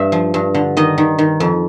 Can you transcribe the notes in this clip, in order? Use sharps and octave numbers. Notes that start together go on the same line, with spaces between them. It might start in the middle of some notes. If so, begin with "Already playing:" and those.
Already playing: G2 E5
F3
G2
D3
D#3 D#5
D#3
D#3
F2